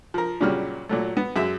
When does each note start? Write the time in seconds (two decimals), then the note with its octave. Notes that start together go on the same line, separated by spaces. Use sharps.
0.14 F3 A#4
0.41 A#2 C#3 F#3 G3 F6
0.89 A#2 F#3 A3
1.17 B3
1.36 F#2 G#3 E5